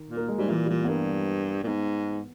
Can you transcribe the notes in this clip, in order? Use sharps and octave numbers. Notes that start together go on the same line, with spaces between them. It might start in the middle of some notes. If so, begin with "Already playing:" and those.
Already playing: D#3
A#2
A#3
G#3
G#2 G3
A#2 E3
G3
A#2 E3
B3
G2 A#3
A#2
G#2 B3